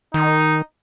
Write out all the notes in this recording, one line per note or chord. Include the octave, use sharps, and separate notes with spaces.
D#3 D#4